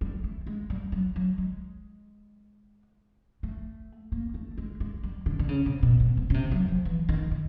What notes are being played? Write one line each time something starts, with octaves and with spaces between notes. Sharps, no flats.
G3
A3
G#3
G3
F#3
F#3
G#3
A3
A#3
A3
G#3
G#3
G3
D3
D3
C#3
C3
B2
B2
C3
C#3
C3
F#3
F3
E3
D#3
D#3